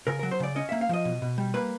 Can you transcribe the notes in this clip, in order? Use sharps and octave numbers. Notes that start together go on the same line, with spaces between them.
C#3 A#4
A#4
F#3
C5
C#3 D5
C#4 D#5
A#3 E5
F5
F3 D#5
B2
B2
G3
A#3 B4